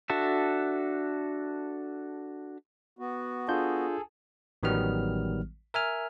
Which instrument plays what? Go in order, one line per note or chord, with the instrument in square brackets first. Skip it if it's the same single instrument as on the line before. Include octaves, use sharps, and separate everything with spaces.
[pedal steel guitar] D4 F#4 A4 E5
[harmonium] B3 F#4
[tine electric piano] D4 F4 G6 [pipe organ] G#4 A4
[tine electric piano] A1 D#3 F#3 G3 B3 F6
A#4 E5 G#5 F6